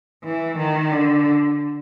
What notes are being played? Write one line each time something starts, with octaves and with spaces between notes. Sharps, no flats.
E3
D#3
D3